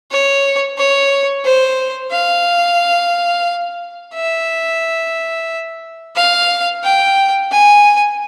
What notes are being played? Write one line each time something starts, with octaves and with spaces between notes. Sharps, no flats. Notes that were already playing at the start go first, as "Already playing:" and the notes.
C#5
C#5
C5
F5
E5
F5
G5
G#5